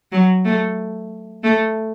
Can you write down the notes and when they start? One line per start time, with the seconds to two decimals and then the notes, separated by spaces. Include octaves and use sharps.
0.12 F#3
0.45 A3
1.43 A3